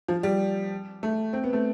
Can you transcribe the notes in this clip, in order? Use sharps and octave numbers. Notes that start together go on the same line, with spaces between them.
F3
G3
A3
C4
B3
A3